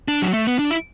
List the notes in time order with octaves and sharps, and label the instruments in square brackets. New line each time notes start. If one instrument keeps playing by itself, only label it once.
[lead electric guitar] D4
F#3
A3
B3
D4
E4